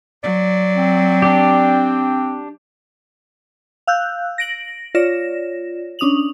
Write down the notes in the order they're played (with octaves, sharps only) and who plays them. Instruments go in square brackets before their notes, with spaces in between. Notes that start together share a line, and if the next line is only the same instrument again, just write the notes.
[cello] F#3 [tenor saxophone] D5
[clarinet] C4
[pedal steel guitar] D4 G4
[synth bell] F5 E6 F#6 G6
A#6 D7 F#7
F4 C#5 D5 A#6 E7
C#4 D4 D#6 F7 F#7